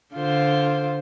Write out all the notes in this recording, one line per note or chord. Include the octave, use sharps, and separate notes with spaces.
D3 F4 C5